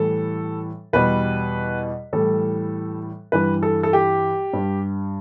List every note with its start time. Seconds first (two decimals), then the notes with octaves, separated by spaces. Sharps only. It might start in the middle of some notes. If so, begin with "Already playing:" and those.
Already playing: A2 E3 G3 A4
0.93 E2 B2 G3 B4
2.13 A2 E3 G3 A4
3.32 G2 E3 G3 B4
3.63 A4
3.83 A4
3.93 G4
4.53 G2 G3